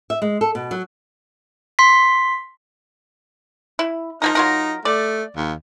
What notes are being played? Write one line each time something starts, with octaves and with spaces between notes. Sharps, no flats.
E5
G#3
A4
B2
F#3
C6 B6
E4
F3 A#3 D#4 A#4
F#3 F4 A#4
A3 D5
D#2